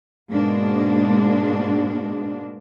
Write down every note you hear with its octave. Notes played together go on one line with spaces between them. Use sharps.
G#2 B2 G#3 A#3 D4